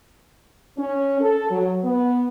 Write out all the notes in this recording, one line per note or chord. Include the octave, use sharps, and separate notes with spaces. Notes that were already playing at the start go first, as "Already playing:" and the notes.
C#4
A4
F#3
B3